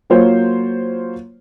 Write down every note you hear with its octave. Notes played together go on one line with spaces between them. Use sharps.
F#3 A#3 F4 C5 C#5